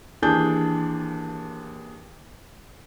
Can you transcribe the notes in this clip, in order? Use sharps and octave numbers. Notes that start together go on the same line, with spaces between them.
D#2 E3 D4 G#4 A5 G6